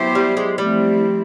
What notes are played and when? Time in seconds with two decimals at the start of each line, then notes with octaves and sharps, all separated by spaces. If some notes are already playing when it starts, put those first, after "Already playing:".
Already playing: F#3 B3 E4 G4 C5
0.15 G3
0.37 G#3
0.58 F3 G3 A3 C4 E4